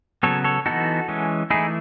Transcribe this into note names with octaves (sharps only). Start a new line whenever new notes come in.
C#3 F#3 B3 A4 C#5
A4 C#5
E3 B3 D#4 F#4 A4
E3 G#3 C#4
E3 A3 D#4 E4 G#4